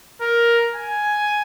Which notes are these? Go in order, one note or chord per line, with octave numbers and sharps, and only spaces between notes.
A#4
G#5